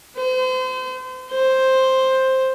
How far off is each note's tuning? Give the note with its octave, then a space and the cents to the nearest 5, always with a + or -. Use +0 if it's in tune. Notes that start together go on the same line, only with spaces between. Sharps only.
C5 -35
C5 +5